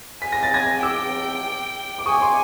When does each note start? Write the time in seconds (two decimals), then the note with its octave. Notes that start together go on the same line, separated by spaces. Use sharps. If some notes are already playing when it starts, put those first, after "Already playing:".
0.21 G#5 B6
0.32 A#6
0.43 A6
0.54 G#6 A#6
0.83 G5 D6 E6
1.98 D6
2.06 G#5 C#6 D#6
2.22 C6 D6